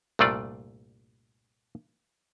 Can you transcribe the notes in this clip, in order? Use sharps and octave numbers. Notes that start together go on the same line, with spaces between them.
C2 G2 A#2 A3 F4 D5